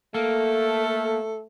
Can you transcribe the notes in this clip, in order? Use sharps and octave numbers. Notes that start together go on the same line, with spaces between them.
A3 A#3 A4